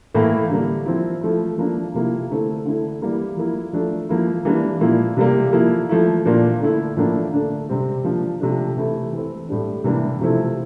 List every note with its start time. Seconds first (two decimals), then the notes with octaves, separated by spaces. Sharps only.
0.14 A2 E3 A#3 E4
0.50 D3 G3 A#3
0.86 F3 C4 E4
1.21 F3 A3 E4
1.58 F3 A#3 D4
1.94 C3 F3 A#3 E4
2.30 D3 A3 C4 E4
2.65 D3 A3 E4
3.02 E3 G3 A#3 E4
3.37 F3 A#3 E4
3.73 F3 A3 D4
4.09 F3 A#3 E4
4.45 E3 G3 A#3 D4
4.81 A#2 F3 A#3 E4
5.17 C3 G3 A#3
5.53 F3 A#3 E4
5.89 F3 A3 E4
6.25 A#2 F3 A#3 D4
6.61 D3 A3 E4
6.97 A2 F3 A#3 D4
7.33 D3 A3 D4
7.69 C3 G3 C4
8.04 F3 A#3 D4
8.40 C3 F3 A3 D4
8.76 C3 E3 A3 C4 E4
9.13 E3 A3 C4
9.49 A2 G3 D4
9.84 C3 E3 G3 A#3 D4
10.20 C3 F3 A3 C4 E4